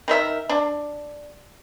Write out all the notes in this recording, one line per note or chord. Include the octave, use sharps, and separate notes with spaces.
D#3 A#4 E5
D4